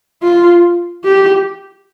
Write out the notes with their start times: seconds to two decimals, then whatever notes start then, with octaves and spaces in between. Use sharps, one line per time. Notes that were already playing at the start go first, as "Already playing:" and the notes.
0.23 F4
1.04 G4